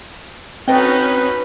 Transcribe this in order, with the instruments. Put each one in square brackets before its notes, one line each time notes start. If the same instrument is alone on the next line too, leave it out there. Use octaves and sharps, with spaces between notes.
[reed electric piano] C4 [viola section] C#4 D#4 F#4 [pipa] A4 D#5 G5 [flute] B4